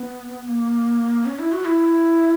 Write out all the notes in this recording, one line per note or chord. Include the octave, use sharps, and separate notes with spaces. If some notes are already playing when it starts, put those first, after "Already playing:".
Already playing: B3
A#3
C#4
E4
F#4
E4